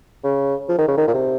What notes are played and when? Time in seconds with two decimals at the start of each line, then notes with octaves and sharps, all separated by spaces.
0.24 C#3
0.69 F3
0.78 D#3
0.88 C#3
0.98 D#3
1.08 A#2
1.14 C3